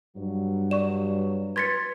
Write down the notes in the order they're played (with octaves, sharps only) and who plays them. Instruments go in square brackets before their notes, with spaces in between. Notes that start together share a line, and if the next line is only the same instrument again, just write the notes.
[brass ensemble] G2 F#3
[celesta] D5 [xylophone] C#6 E7
[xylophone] B4 C6 A6 [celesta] G#6 B6 C#7